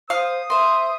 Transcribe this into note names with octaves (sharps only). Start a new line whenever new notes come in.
C5 F5 D#6
C5 E5 C6